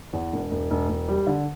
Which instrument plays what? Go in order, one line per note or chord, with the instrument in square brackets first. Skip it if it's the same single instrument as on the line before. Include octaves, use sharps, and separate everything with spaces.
[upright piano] E2
E1
E1
E1
E1
G3
D3